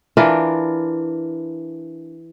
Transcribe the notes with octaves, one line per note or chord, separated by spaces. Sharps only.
E3 D4 F4 A#4